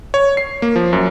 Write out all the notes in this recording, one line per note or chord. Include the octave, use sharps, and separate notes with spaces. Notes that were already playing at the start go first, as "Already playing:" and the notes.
C#5
C7
A#3
F3
F#2